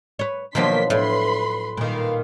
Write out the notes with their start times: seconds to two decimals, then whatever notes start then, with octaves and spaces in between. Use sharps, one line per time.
0.19 B4 C#5
0.55 B2 D#3 F3 F#3 A#3 D4 C6 B6
0.90 A2 D4 B4 B5 C6
1.77 A#2 D#3 B4 F5